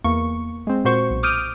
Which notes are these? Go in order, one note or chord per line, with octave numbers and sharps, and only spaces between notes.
E2 A#3 C#6
G#3 C4
A#2 F#4 C5 C#6
B1
D6 D#6 F6 G6 D7 D#7